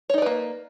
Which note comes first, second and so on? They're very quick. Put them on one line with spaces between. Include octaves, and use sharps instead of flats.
C#5 D#4 D5 B4 A#3